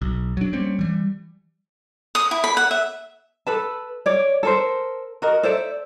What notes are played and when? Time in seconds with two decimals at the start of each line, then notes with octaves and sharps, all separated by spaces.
0.02 B1
0.37 F#3 D4
0.53 G3 A#3 C4 C#4
0.79 E3 G3
2.15 D#6
2.31 E4
2.44 B5
2.57 F#5
2.71 E5
3.47 A4 B4 A5
4.06 C#5 D5
4.43 A4 A#4 C5
5.22 F#4 A#4 D#5
5.43 A4 C5 D5 E5